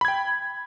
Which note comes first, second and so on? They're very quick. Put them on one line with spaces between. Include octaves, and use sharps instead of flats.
B5 G#6 G5